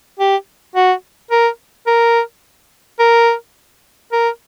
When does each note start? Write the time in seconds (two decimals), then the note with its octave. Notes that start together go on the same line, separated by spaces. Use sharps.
0.19 G4
0.75 F#4
1.31 A#4
1.87 A#4
3.00 A#4
4.12 A#4